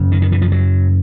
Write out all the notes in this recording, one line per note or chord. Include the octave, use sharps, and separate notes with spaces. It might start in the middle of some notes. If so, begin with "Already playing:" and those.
Already playing: F#2 C#3
D#3
D#3
E3
F3
F#3